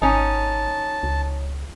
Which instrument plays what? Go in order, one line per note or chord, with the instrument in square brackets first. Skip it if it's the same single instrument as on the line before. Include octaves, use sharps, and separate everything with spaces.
[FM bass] G#1 [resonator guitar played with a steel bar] C#4 D#4 [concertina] A5
[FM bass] C#2